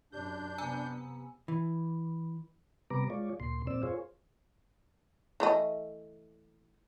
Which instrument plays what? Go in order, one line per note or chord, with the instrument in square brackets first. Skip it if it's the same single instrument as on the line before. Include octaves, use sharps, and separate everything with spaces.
[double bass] F#2 [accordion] D4 G6 [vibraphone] G4
[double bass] C3 B3 [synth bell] G#5 A#5 E6
[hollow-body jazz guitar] E3
[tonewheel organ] C3 G3 B3 B4 A#5 D6
G#3 F4 C#5 D5
D2 A#2 C6
F2 A#2 C4 D5 E6
F4 G#4 C5 C#5
[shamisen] E3 A3 D#5